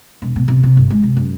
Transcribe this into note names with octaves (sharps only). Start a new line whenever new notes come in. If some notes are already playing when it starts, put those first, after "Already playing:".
E1
B2
C3
C3
G1
G#3
C3
F#2